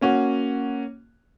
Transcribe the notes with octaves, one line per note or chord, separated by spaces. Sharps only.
A#3 C#4 F#4